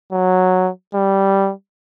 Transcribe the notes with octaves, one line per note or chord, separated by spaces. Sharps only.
F#3
G3